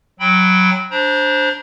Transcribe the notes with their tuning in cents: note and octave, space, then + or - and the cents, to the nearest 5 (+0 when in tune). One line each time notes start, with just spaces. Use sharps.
F#3 +0 G5 +0 B5 +0
D4 -5 C5 +10 A#5 +35